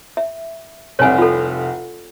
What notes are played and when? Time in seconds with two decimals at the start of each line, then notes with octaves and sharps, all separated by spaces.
0.17 E5
0.99 F1 C2 C#5 G#5
1.18 F4 A4